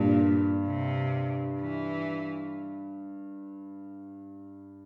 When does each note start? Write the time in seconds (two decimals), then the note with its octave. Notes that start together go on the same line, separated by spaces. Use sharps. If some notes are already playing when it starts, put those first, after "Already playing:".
Already playing: G2 A#2
0.65 C3
1.61 E3